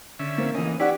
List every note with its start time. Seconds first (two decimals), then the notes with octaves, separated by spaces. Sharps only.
0.19 D3 C#4 E5
0.38 A#3 C4
0.55 E3 C#4 D#5
0.80 C#4 D#4 E4 G4 B4 D5 F#5